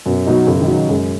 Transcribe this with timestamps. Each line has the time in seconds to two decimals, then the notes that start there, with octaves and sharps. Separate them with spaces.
0.06 F#2 B2
0.26 B2 F#3 D#4
0.47 F#2 C#3
0.61 D#3
0.67 F#3 D#4
0.89 F#2 G#3